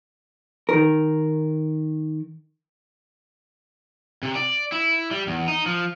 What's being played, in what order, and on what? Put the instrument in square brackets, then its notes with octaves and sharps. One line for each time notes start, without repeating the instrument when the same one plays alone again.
[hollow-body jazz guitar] D#3 A#4
[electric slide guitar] C3
D5
E4
G3
E2
D#4
F3